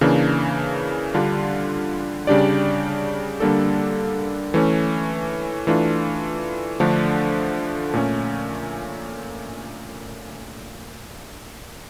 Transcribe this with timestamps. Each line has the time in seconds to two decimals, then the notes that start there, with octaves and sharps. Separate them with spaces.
0.01 C#3 E3 A#3 D4
1.14 D3 G3 D4 F4
2.27 C#3 G3 D4 G4 D5
3.40 D3 G3 A#3 D4 A4
4.54 E3 A3 C#4
5.67 E3 A3 D4 F4
6.80 D3 F3 A3 D4
7.94 A#2 A3 C#4